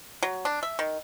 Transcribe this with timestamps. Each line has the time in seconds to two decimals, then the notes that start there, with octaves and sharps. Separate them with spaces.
0.23 F#3
0.45 D4
0.63 E5
0.79 D#3